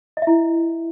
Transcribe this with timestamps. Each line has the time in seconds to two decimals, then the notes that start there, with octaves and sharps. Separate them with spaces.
0.17 D#5
0.22 E5
0.27 E4